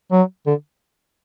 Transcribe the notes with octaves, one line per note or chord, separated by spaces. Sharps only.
F#3
D3